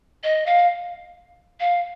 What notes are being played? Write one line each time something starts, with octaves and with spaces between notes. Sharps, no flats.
D#5
F5
F5